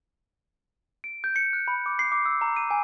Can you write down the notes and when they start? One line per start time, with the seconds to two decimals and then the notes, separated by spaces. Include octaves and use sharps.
1.04 D7
1.24 G6
1.36 C#7
1.53 F#6
1.68 B5
1.86 D6
1.99 C7
2.12 D6
2.26 E6
2.41 A#5
2.56 D#7
2.71 G#5